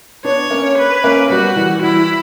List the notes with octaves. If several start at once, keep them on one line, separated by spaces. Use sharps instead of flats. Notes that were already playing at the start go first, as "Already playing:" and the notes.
B3 D4 C#5
A#3 C#4
B4
A#3 C#4
G3 B3 F#4
E3 G3
E3 G3 E4